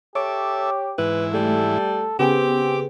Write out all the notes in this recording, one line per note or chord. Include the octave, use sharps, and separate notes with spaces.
G4 A4 C#5 E5 D6
G#2 E3 E4 B4
G3 A3 A4
C#3 B3 C4 G4 G#4 D6